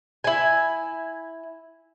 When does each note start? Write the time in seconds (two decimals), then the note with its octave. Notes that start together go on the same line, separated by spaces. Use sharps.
0.24 E4 G#5